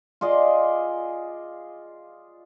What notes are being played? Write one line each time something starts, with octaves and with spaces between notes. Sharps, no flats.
F4 G#4 D5 D#5